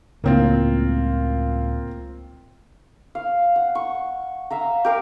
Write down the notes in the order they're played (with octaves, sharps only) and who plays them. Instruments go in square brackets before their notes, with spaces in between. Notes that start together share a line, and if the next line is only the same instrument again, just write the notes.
[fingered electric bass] C#2 A2 [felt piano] A#3 C4 F4
[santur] F5
F#5
C#6
E5 F5 A#5
G4 A#4 F5